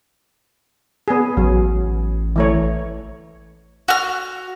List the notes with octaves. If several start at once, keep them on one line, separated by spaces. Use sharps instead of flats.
B3 G#4
A1 F#3
E3 A3 C#5
F#4 F6